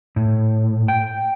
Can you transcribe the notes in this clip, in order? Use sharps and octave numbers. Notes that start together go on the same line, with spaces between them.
A2
G5